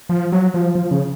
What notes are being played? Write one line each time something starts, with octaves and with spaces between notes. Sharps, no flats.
F3
F#3
F3
F3
C#3